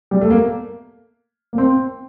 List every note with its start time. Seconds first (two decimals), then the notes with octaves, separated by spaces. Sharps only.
0.11 G3
0.21 A3
0.30 A#3
1.53 A#3
1.58 C4